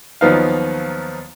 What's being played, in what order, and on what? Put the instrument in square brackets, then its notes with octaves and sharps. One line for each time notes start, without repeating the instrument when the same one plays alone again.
[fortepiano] D#2 F3 F#3 B3 D#4 F5